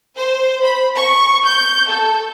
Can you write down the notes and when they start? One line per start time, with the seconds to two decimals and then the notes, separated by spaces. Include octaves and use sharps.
0.18 C5
0.64 B5
0.96 C#6
1.46 G6
1.87 A4